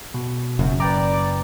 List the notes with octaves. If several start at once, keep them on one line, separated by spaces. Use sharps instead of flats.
B2
F#1 F#2
B4 D5 G5 A#5